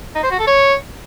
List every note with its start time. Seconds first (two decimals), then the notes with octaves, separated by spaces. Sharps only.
0.15 D#4
0.23 C5
0.31 F#4
0.39 A4
0.47 C#5